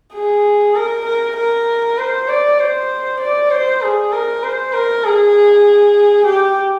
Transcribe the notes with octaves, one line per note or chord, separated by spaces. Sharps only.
G#4
A#4
A#4
A#4
C5
D5
C5
D5
C5
G#4
A#4
C5
A#4
G#4
G4